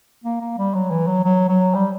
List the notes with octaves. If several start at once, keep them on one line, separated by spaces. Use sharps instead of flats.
A#3
A#3
G3
F#3
E3
F#3
F#3
F#3
G3